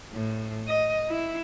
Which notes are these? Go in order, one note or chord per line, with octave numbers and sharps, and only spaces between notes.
A2
D#5
E4